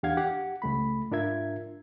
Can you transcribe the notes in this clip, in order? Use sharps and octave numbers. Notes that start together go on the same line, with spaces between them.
E2 D4 G4 F5 F#5 G#6
G4 F#5
C#2 A3 B5
G#2 D4 F4 A#4 E5 G#6